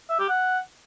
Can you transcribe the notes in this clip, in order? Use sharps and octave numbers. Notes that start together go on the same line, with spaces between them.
E5
G4
F#5